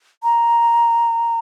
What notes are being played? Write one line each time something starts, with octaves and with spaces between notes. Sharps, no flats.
A#5